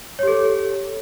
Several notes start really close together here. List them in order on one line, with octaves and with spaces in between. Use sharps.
C#5 G4 A4